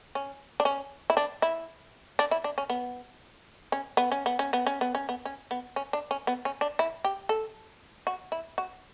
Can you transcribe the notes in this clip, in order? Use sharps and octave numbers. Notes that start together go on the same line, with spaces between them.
C#4
D4
C#4
E4
D4
E4
D4
E4
D4
C#4
B3
C#4
B3
C#4
B3
C#4
B3
C#4
B3
C#4
B3
C#4
B3
C#4
D4
C#4
B3
C#4
D4
E4
G4
A4
F#4
E4
F#4